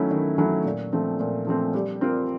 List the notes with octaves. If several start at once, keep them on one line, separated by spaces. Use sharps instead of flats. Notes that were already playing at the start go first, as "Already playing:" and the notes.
Already playing: D#3 F#3 A3 C#4 E4
D#3
F#3 A3 C#4 E4
A#2
F3 A3 C4
A#2
F3 A3 C4
G3
C4 F4 A#4